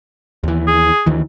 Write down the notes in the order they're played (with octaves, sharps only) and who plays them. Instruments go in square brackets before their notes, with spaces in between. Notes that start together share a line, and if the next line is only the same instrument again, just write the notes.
[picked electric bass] D#2 E3
[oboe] G#4
[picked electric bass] D2 D#3 E3